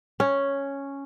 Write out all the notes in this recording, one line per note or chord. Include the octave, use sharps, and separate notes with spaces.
C#4